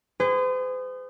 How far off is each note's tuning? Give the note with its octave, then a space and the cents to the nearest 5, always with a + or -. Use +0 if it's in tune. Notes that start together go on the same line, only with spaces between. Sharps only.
G#4 -20 C5 -45